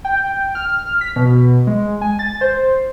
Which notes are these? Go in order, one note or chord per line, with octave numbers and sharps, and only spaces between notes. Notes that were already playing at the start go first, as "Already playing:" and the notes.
G5
F6
B6
B2
G#3
G#5
A6
C5